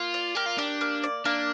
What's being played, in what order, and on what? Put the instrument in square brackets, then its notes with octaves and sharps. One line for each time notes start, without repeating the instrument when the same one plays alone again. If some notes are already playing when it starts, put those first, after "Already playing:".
Already playing: [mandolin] A#3 [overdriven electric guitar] F4
[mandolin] D5
[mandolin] A#3 [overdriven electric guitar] G4
[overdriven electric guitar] F4
[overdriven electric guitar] D4 [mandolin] G4
[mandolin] A#3
D5
[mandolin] A#3 [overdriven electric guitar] D4